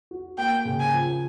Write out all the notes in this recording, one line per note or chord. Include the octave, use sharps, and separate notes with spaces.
F#4
A#3 G5
C#3
G#5
F3